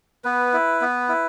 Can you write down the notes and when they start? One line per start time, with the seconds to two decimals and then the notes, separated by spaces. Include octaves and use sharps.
0.24 B3 B4
0.53 E4
0.81 B3
1.09 E4